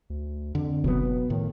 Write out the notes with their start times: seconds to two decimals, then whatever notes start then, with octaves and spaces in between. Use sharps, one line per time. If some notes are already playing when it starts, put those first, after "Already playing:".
0.10 D2
0.55 F2 D3
0.84 F#1 B2 F#3 B3
1.30 A2 D#3